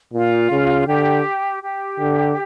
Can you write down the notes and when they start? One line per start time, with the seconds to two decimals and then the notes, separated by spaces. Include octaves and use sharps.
0.13 A#2 F4
0.51 C#3
0.87 D3 G4
1.62 G4
2.00 D3